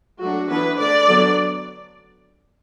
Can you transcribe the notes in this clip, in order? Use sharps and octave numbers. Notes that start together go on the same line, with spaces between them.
F#3 A3 D4 F#4
E3 B3 D4 B4
D3 A3 D4 D5
D3 F#3 B3 D4